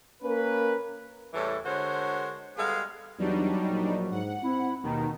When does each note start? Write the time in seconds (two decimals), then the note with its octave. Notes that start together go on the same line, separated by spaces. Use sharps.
0.22 A#3 C#4 A#4 B4
1.34 E2 A2 E3 G3 A4 C#5
1.64 D3 G#3 F#4 A#4 C5 C#5
2.57 G3 G#3 B3 G#4 A4 F5
3.19 E2 F#3 G3 D4 D#4
3.68 A#1
4.11 G#2 F#5
4.43 C4 E4
4.83 D#2 B2 D#3 D#4